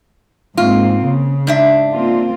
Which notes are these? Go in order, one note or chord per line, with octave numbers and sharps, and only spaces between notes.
G#2 A#3 C4 F4
C#3
G#2 D4 E5
A#3 C4 F4